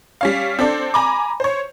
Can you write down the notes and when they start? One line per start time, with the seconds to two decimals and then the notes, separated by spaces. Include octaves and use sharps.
0.21 G3 C#4 F5
0.59 C4 D4 A4 D5
0.94 G#5 A#5 B5 D6
1.40 C5 C#5